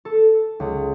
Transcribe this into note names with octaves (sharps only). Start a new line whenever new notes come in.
A4
C#2